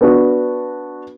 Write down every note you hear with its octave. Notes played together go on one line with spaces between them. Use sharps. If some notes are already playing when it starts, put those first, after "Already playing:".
B3 D4 F#4